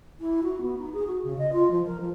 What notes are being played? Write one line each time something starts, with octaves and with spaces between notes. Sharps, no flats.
E4
F#4
B3
D#4
G#4
F#4
C#3
D#5
F4
F3
A#4
F3